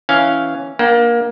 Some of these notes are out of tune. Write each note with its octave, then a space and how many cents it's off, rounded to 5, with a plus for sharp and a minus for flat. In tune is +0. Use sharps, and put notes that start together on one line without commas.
E3 +0 C#4 +0 F5 +0
A#3 +20 D4 +0 G5 -30